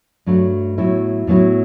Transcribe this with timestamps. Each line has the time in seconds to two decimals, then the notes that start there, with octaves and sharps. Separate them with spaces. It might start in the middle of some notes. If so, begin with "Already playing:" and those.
0.26 G2 F#3 A3 D4
0.78 A2 F#3 B3 E4
1.27 A2 F#3 B3 E4